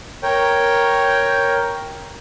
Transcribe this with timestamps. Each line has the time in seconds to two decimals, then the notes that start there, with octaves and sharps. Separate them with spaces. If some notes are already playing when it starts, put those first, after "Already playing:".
0.23 A#4 C#5 G5